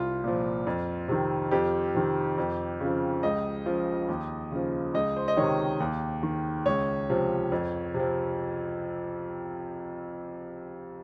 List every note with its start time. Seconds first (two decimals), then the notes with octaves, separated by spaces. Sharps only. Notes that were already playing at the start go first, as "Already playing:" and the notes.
Already playing: C2 F4
0.24 A#2 F3
0.67 F2
1.08 C3 D#3
1.51 F2 G4
1.95 C3 D#3
2.38 F2
2.80 C#3 F3
3.23 C#2 D#5
3.66 C#3 F3
4.09 D#2
4.52 C#3 F3
4.94 C#2 D#5
5.16 C5
5.28 D#5
5.37 C3 D#3 C#5
5.80 D#2
6.23 D#3
6.66 C#2 C#5
7.09 C3 F3
7.52 F2
7.94 C3
7.99 F3